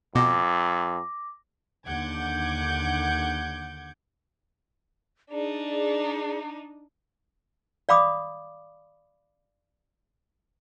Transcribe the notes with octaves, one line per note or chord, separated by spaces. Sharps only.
F2 B2 D6 A#6
D#2 D3 F#5 D6 G6 G#6
D4 D#4 G#4 D5
D5 F5 B5 D6 D#6